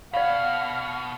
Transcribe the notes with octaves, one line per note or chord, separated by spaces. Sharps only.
B2 D5 F5 F#5 F6